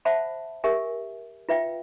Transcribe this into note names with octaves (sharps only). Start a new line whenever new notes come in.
C5 E5 F#5 A5 B5
G4 A#4 E5 G#5
F4 B4 E5 F5 G5